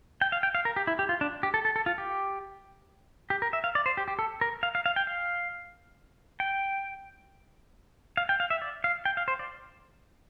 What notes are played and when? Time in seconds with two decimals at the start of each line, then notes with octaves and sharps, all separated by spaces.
0.22 G5
0.32 F5
0.43 G5
0.55 F5
0.65 A#4
0.76 G4
0.87 E4
0.99 G4
1.09 F4
1.21 D4
1.43 G4
1.54 A4
1.65 A4
1.76 A4
1.86 F4
1.98 G4
3.30 G4
3.42 A#4
3.53 E5
3.64 F5
3.75 D5
3.86 C5
3.97 G4
4.08 G4
4.19 A4
4.41 A#4
4.63 F5
4.75 F5
4.86 F5
4.96 G5
5.07 F5
6.40 G5
8.17 F5
8.29 G5
8.40 F5
8.50 E5
8.62 D5
8.84 F5
9.05 G5
9.17 F5
9.28 C5
9.39 D5